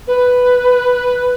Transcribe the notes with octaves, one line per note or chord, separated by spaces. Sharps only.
B4